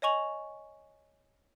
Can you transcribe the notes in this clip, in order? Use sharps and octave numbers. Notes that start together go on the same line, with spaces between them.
C#5 D#5 G#5 C#6 F7 F#7